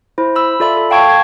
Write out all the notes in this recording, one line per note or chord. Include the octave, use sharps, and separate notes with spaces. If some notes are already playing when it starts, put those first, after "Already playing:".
E4 C5
B5 E6
F4 A4 D5 E5 B5
A4
F5 G5 A5 C#6 G#6 D7
G#6